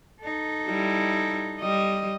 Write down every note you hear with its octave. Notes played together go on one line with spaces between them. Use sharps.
D#4 A4
G3 E4
G3 D#5